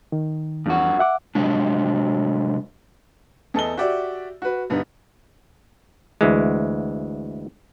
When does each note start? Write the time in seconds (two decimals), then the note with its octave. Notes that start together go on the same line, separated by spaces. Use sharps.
0.12 D#3
0.66 E2 G2 F#4
0.99 E5 F#5 D6
1.35 C3 F#3 G#3 D4
3.54 E2 A4 D#5 G7
3.77 F#4 G4 D5 E5
4.42 F#4 B4
4.70 G2 D3 B3 D#4
6.21 D2 E3 G#3